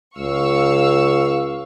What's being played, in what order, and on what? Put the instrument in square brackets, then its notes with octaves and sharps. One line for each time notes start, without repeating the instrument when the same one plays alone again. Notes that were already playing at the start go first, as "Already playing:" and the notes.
[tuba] C#2 [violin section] F5 C#6 E6